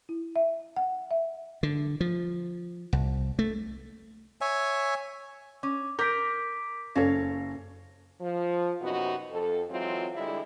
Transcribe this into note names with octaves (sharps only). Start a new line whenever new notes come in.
E4
E5
F#5
E5
D3
F3
C2
A3
C#5 E5 G#5
C#4 D6
A#4 D6 G6 B6 D7
F#1 C#4 A4 C#5 F5 A#6
F3
F#2 C3 B3 D#4 F#4
F2 A4
E3 F#3 G#3 C4 F4
D3 G3 G#3 E4